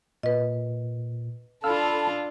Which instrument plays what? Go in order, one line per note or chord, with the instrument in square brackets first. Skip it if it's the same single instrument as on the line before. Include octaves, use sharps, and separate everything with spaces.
[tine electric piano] A#2 [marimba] B4 D#5
[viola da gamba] D4 F4 [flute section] A4 A5 B5 [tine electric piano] F5 E6 F6